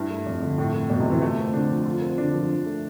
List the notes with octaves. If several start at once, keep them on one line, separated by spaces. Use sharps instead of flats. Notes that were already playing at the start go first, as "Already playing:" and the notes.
Already playing: G2 E4
A3
F2
D3
A2 E4
A3
F2 B2
C3
D3 E3
A3 F4
C4
D3 D4
F3
F4
C4
D3 D4
F3
D4
A3